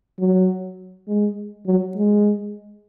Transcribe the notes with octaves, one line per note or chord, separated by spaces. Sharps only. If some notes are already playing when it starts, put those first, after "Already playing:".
F#3
G#3
F#3
G#3